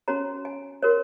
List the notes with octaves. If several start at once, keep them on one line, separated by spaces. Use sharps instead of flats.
C#4 F#4 C#5 A#5
G#5
F#4 A#4 C#5